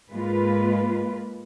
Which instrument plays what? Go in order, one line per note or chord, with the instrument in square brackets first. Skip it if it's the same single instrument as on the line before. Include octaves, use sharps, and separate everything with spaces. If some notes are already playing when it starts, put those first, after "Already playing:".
[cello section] G#2 G#3 A#3 F4 B4